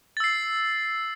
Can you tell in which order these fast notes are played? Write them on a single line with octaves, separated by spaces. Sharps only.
A6 E6 C7